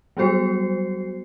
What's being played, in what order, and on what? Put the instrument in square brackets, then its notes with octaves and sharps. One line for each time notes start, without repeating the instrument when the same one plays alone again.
[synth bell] F#3 G3 B3 F#4 C5 C7